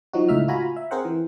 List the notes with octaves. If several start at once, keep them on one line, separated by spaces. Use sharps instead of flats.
F3 F#3 D#4 F#4
C#2 A2 D#4 E5 F6
F4 F#4 G#5 A#5 B5
E5
C4 G#4 A#4 C5 F#5
E3